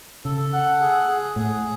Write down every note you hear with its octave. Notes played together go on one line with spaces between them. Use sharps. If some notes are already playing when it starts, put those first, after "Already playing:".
C#3 A4
F#5
G#4
G#4
A2 G#4